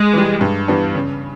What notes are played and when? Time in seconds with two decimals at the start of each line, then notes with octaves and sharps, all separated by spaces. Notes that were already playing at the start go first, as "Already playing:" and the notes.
Already playing: G#3
0.13 E3 G3
0.41 G2
0.68 E3 G3 B3 D4
0.95 C#3